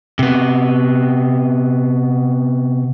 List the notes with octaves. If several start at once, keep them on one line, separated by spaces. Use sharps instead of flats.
C3 B3